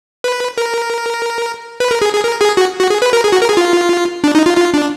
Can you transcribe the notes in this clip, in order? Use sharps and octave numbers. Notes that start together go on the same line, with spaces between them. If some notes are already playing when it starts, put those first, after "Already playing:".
B4
A#4
B4
A#4
G#4
G#4
A#4
G#4
F#4
F#4
G#4
B4
A#4
G#4
F#4
A#4
G#4
F4
D4
D#4
F4
F4
D4